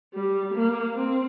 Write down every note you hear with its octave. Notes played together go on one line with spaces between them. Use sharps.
G3
A#3
C4